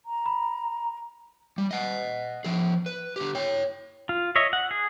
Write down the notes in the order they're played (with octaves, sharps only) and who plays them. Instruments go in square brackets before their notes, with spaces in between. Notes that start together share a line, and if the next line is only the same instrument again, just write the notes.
[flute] A#5
[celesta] B5
[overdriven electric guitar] G3
D#5 F#5
F3 G#4
B4
D3 G4
C#5 G5
[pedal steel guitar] F4
C#5 D#5 E5
F#5
G#4